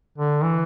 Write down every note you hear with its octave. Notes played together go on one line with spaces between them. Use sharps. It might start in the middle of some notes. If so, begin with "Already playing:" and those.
D3
E3